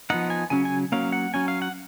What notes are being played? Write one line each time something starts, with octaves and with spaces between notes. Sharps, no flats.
F3 B3 D#4 F#5
G#5
C#3 F#3 C#4 G#5
G#5
F#3 A#3 C#4 F5
F#5
F#3 C#4 G#5
F5
F#5